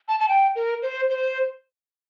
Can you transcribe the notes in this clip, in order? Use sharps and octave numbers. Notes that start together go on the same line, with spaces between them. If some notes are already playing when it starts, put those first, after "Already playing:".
A5
A5
G5
A#4
C5
C5